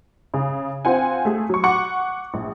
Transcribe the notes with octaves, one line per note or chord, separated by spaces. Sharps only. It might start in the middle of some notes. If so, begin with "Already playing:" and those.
C#3
C4 F4 C5 F#5 G#5
A3 G#4
F#3 C#6
F#5 C#6 D6 C#7
A#1